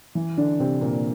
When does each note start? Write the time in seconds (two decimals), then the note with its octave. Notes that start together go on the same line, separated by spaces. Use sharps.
0.15 E3
0.37 D3 D4
0.60 C3 C4
0.81 A#2 A#3